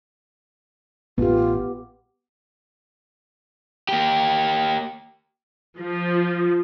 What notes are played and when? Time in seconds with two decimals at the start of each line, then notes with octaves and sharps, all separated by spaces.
1.18 A1 B3 F4 G4
3.89 A#3 G4
5.80 F3